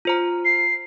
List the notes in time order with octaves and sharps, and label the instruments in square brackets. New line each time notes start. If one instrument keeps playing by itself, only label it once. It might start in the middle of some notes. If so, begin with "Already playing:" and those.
[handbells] F4 C5 A#5
[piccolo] C7